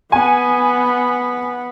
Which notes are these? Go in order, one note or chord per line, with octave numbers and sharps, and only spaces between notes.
B3 G#5